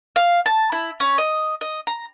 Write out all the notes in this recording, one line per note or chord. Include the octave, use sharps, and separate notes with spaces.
F5
A5
E4
C#4
D#5
D#5
A#5